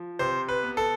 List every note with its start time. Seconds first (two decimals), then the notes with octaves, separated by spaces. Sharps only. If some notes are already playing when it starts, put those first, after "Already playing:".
Already playing: F3
0.19 C3 C5
0.49 B4
0.63 B3
0.77 A4